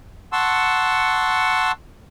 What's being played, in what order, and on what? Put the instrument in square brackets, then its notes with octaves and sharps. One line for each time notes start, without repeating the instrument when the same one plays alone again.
[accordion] F#5 A5 C6 C#6 E6